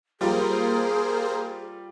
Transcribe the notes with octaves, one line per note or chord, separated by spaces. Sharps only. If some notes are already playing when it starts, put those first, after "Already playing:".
G3 A#3 F4 G#4 A#4 C5